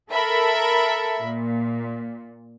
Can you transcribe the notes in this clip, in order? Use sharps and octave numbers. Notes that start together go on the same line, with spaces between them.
A4 A#4 E5 B5
A#2